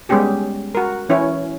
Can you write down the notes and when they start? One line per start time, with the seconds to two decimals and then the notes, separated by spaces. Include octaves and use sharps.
0.09 G3 G#3 B3 C#4 G4 G#4
0.75 F#4 A#4
1.09 E3 C#4 E4 B4 C#5